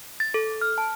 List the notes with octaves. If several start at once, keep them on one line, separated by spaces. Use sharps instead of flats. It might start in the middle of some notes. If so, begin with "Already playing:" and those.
A6
A4
F6
A5